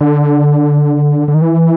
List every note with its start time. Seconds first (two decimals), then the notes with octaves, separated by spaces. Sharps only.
0.01 D3
1.28 D3
1.34 D#3
1.42 E3